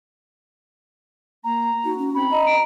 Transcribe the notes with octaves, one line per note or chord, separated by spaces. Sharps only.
A#3 A#5
D#4 F#4
C#4
C4 B5
D#5 A#5
D7